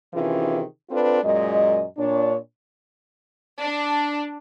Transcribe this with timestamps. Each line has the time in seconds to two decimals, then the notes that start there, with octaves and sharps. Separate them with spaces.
0.14 C3 D#3 E3 C#4 F4 G#4
0.90 C4 D4 F4 A4 B4
1.23 F#2 A#2 G#3 D#5
1.98 A#2 D4 C#5
3.61 D4